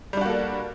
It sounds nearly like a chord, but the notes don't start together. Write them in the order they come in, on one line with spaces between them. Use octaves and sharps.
G3 D4 F#4 A#3 A4